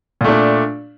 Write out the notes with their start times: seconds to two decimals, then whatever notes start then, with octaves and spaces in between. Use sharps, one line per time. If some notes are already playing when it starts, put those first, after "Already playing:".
0.21 A#2
0.24 A3
0.28 D4